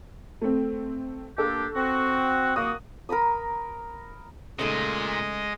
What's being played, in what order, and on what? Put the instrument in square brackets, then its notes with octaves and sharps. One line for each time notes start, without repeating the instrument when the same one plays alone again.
[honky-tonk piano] A3 C4
[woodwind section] A#3 D4 G4 [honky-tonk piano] A4
[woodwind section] C4 F#4
[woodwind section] A#3 F#4 [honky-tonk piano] D#6
[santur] A#4 A#5 B5 D#6
[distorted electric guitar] A#2 [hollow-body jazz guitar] C#3 A3 D#4 [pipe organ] G#3 D#5